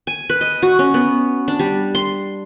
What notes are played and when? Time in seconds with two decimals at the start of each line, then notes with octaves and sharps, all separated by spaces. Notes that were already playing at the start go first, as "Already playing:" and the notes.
0.07 G#5
0.30 B4
0.41 D#5
0.63 F#4
0.79 C#4
0.94 B3
1.48 D4
1.59 G3
1.95 C6